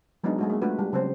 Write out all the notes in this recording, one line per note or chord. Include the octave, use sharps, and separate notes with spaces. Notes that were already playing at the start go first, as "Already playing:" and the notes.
F#3 G#3 B3 D4 D#4 F#4
G#3 A3 F#4
A#3 G#4
G#3 A3 D4 F4 F#4 B4
G3
C#3 F#3 C4 C#4 C5